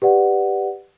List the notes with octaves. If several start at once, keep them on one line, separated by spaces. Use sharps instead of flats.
G4 B4 D5 F#5